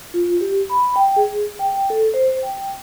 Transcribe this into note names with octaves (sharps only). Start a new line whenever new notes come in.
F4
G4
B5
G5
G#4
G5
A4
C5
G5